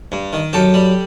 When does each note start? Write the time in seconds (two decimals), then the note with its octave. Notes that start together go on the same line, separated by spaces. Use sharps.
0.12 G2
0.33 D#3
0.53 F#2 G4 A4
0.74 G3